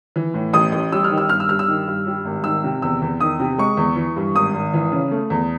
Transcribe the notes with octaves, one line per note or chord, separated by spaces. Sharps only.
E3
A2
A1 D#6
A1
G3 E6
F6
D#3
E6
G2 F6
E6
G2 F6
E6
D#3
G2
G3
G#1
D#3 E6
C3
E2 E6
E2
D#3 D#6
C3
G#3 C#6
E2
E3
G2
G#1 D#6
G#1
E3
C#3
A3
E2